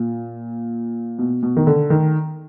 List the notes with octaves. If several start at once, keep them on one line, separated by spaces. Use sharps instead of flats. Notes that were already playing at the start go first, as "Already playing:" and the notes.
Already playing: A#2
B2
B2
D#3
D3
D#3